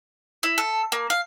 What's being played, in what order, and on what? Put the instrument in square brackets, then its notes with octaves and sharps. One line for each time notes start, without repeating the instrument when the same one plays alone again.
[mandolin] E4
A4
A#3
F5